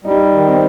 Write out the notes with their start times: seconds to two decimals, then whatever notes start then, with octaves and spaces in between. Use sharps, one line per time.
0.04 G3 D#4
0.33 D#3
0.47 C4